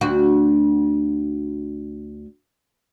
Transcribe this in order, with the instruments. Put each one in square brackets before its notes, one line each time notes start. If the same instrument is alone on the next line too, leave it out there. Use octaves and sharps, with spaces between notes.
[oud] D2 F#4